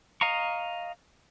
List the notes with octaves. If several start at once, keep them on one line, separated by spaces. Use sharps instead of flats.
D#5 F5 A#5 C#6